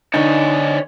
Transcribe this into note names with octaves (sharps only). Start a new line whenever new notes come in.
D3 D#4 C#5 D5 G#5